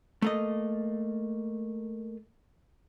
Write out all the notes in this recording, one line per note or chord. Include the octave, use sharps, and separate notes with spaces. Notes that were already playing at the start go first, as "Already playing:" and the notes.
A3 A#3 D#5